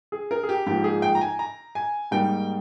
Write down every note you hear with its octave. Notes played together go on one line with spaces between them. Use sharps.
G#4
A#4
G#4
G4
G#2 F3 A#3 D#4 G4
G#4
G5
A#5
G#5
A#5
G#5
G#2 G3 A#3 D#4 G5